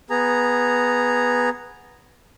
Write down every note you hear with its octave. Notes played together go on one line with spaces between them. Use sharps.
B3 G#4 A#5